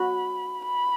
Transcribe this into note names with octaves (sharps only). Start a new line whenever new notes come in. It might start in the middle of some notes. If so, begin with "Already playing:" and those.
Already playing: F#4 B5
B5